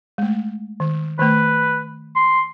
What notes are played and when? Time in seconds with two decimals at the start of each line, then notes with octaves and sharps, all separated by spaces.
0.18 G#3 A3
0.80 D#3
1.19 D#3 A3 B4
2.16 C6